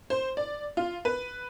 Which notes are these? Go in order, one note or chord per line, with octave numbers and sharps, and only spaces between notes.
C5
D5
F4
B4